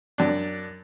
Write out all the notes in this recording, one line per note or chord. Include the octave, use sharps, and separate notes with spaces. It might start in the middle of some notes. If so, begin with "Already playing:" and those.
F#2 D4